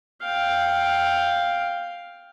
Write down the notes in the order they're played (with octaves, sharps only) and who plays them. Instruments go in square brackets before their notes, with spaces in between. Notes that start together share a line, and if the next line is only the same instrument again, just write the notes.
[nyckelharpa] F5 G5